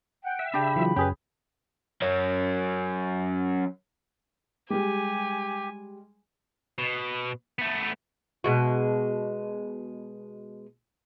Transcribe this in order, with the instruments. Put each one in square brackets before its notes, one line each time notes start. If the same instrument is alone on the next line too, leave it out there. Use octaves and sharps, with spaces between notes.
[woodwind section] F#5 G5
[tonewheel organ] E5
[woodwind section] C#3 B5 [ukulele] D4 G4
[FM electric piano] E3 F#3 F4
[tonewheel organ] F#2 [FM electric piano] C#4 G#4 [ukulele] G4 B4
[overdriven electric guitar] F#3 C#4
[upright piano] G3 G#3 [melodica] G4 [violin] G#5
[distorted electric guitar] B2
A3 B3
[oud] B2 G#3 F#4